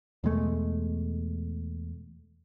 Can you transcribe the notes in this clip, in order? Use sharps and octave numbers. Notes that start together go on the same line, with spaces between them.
E2 B2 G#3 A3